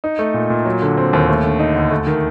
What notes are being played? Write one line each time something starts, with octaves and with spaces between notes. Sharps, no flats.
D#4
A3
A#2
A#2
F#3
D3
C4
D#2
A3
D3
D#4
D2
A3
D#3